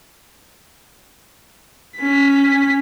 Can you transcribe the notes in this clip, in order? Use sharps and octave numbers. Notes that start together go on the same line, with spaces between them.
C#4 B6